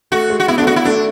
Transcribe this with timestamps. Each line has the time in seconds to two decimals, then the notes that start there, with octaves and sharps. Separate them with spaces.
0.12 A3 F#4
0.30 G#3
0.40 F#4
0.48 B3 E4
0.58 A3 D4
0.67 B3 F#4
0.76 E4
0.85 A3 D4